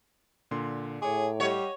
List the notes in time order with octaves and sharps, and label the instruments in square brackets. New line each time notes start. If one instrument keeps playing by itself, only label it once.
[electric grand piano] A#2 D3 C6
[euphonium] A2 [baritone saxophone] G#4 [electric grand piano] C#5 D6
[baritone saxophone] G3 [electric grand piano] G4 D#5 F#5 [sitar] C#5